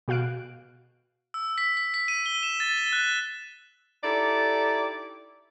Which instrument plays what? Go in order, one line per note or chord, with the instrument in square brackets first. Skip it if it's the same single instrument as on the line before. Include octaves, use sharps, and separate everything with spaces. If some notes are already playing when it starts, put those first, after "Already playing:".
[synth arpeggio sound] B2 F#4 F5 F#6 D7
[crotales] E6
B6
B6
B6
D#7
G7
E7
A6
G7
F#6
[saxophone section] D#4 E4 G4 A4 D5